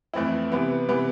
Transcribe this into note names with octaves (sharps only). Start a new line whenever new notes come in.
F2 E3 A3 C4 E4
C3 E3 B3
C3 E3 B3